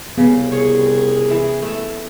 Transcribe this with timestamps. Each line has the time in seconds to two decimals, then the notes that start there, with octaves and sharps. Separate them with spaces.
0.18 C2 C#3 B3
0.52 G#4 C#5
1.30 E3
1.62 A3